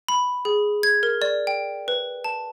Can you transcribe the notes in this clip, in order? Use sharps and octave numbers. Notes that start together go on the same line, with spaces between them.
B5
G#4
G#6
A#4
D5
G5
B4
A5